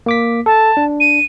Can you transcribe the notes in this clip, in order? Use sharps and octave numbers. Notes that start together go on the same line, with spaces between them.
A#3 D6 B6
A4 A5
D4
D#7